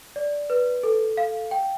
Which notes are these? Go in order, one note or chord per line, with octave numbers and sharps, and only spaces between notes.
D5
B4
A4
F5
G5